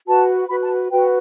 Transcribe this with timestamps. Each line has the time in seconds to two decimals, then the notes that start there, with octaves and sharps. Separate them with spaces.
0.07 F#4 B4 A5
0.49 F#4 B4 B5
0.63 A5
0.90 F#4 B4 G5